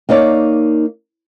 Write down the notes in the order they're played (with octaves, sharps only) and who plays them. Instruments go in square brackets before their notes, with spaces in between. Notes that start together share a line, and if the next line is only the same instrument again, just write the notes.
[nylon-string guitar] A#3 D#4 C#5 D5